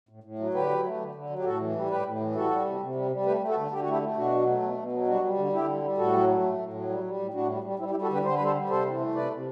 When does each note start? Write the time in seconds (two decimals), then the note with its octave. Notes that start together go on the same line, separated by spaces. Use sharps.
0.09 A2
0.24 A2
0.39 F#3
0.54 D3 G4 B4
0.69 F#3
0.85 A3
1.00 D3
1.15 D3
1.30 F#3
1.39 G4
1.44 A2 F#4 A4
1.59 E3
1.75 G3
1.90 A2 G4 B4
2.06 A2
2.20 E3
2.35 G3 F#4 A4
2.50 G3
2.66 C3
2.81 C3
2.95 G3
3.11 G3
3.25 A3 G4 B4
3.41 A3
3.48 F#4 A4
3.56 D3
3.71 D3 G4
3.81 F#4
3.86 A3 E4 G4
4.01 A3
4.17 B2 D4 F#4
4.32 F#3
4.47 A3
4.62 B2
4.77 B2
4.92 F#3
5.07 G3 D4 F#4
5.22 G3
5.37 D3
5.52 D3 E4 G4
5.68 G3
5.83 G3
5.98 A2 F#4 A4
6.13 F#3
6.28 A3
6.43 A2
6.58 A2
6.73 F#3
6.89 G3
7.03 G3
7.19 A2
7.34 A2 D4 F#4
7.49 G3
7.64 G3
7.79 G3 C4 E4
7.90 E4 G4
7.95 G3
8.02 F#4 A4
8.10 D3 G4 B4
8.25 D3 C5
8.34 B4
8.40 G3 A4 C5
8.55 G3
8.70 C3 A4 C5
8.85 E3
9.00 A3
9.15 C3 B4 D5
9.31 C3